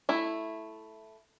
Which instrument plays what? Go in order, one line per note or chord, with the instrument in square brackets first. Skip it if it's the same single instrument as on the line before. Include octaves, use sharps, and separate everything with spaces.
[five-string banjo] A3 E4